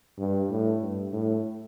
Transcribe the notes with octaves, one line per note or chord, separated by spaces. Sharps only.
G2
A2
G2
A2